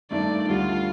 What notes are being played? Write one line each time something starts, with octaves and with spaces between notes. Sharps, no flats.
G2 D#3 A3 D4 D5
D2 D3 G3 F4